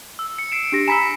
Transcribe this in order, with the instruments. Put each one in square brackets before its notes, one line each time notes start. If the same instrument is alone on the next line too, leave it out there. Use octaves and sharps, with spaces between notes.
[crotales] E6
C#7
C7 D7 E7
[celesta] D4 G4 A#6
[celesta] G#5 A#5 B5 [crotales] E6 B6 E7